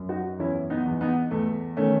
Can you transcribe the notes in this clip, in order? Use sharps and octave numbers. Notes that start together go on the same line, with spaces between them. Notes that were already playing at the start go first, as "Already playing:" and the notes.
Already playing: F#2
D#4 F#4
E2 C#4 E4
B3 D#4
E2
B3 D#4
E2 A3
D#3 A3 C#4